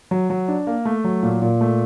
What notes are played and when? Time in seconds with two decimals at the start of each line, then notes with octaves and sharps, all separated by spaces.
0.11 F#3
0.30 F#3
0.48 D4
0.67 A#3
0.85 A3
1.04 F#3
1.23 A#2
1.42 A#2
1.61 A3